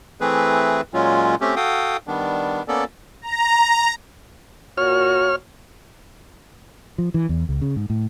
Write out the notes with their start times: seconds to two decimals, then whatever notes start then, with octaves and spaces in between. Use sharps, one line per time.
0.21 E3 A3 C4 G#4 B4
0.94 A#2 F#3 G#3 C#4 F4
1.41 A3 C4 C#4 G4
1.56 F#4 A4 F5 G5 D#6
2.07 D#3 G3 B3 D4
2.68 A#3 B3 C#4 A4 D5
3.22 A#5
4.78 A#2 F#4 C#5 F6
6.98 F3
7.14 E3
7.29 E2
7.49 C#2
7.62 C#3
7.76 G#2
7.90 A2